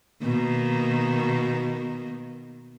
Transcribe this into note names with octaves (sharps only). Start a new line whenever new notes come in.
B2 D#3 A#3